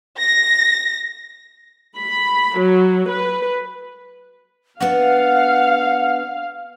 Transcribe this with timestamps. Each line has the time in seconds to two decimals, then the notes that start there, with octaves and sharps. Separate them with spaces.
0.17 A#6
1.97 B5
2.57 F#3
3.09 B4
4.81 B3 D4 F5 F#5